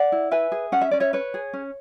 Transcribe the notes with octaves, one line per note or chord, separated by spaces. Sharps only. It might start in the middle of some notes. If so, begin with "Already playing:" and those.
Already playing: D5 F#5
E4
B4 E5 G#5
G#4
C#4 F#5
E5
C#4 D5
C#5 E5
B4 C#5
G#4
C#4